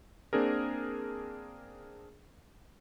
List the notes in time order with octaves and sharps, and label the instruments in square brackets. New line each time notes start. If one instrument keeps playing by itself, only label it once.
[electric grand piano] A#3 C4 D4 G#4 A#4